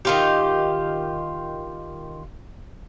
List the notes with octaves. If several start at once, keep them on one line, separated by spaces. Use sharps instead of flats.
D#3 F4 G4